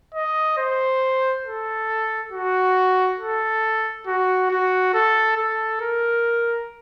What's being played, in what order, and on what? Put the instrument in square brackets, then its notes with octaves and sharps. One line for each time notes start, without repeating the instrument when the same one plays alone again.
[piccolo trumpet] D#5
C5
A4
F#4
A4
F#4
F#4
A4
A4
A#4